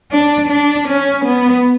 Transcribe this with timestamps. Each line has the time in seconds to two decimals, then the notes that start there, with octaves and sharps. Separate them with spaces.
0.12 D4
0.50 D4
0.88 C#4
1.25 B3